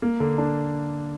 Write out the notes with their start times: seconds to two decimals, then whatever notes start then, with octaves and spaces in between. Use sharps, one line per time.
0.02 A#3
0.20 D3
0.38 D4